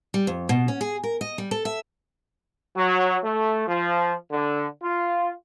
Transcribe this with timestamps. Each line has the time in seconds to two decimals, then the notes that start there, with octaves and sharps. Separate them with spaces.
0.14 G3
0.27 F2
0.49 B2
0.68 C#4
0.81 G#4
1.04 A#4
1.21 D#5
1.38 G3
1.51 A4
1.65 E5
2.76 F#3
3.23 A3
3.68 F3
4.31 D3
4.83 F4